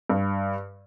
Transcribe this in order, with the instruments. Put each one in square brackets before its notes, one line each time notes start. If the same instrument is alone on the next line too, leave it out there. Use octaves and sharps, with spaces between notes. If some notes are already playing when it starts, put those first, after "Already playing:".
[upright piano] G2